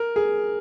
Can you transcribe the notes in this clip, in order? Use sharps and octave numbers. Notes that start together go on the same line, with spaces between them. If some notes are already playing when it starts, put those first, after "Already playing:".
Already playing: A#4
G#4